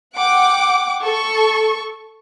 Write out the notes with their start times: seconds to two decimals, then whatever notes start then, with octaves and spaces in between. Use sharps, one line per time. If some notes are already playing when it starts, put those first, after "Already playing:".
0.16 F#5 G5 D6
1.03 A4 C#6